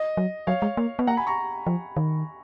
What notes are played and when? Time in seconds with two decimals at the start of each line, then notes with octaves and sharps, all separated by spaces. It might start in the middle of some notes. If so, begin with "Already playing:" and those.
Already playing: D#5
0.17 F#3
0.47 F#3 C#5 F5
0.62 G#3
0.77 A#3
0.99 B3
1.07 A#3 F#5 A#5
1.17 G#5 B5
1.27 A#5 C#6
1.67 F3
1.97 D#3